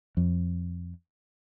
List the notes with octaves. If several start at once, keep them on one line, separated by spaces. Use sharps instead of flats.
F2